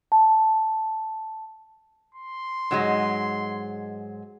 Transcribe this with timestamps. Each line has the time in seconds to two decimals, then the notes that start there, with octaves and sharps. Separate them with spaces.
0.12 A5
2.15 C6
2.71 G#2 F#3 G#3